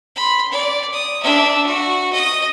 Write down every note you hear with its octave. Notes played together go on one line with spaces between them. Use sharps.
B5 C6
D5
D#6
D4 E5
F#4
D#5 D#6